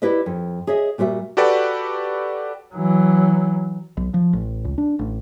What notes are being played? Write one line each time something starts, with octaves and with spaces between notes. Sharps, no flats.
E4 G4 B4 D5 D#5
F2
G#4 C#5 D#5 E5
A#2 G3 F#4 B4 E5
F#4 G4 A4 B4 D5
E3 F#3
B1
F3
A1
C#2
D4
A1